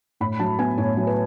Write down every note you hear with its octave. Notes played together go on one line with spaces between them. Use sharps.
A2 B5
F#3 A5
B3 G#5
A2 C#5
F#3
B4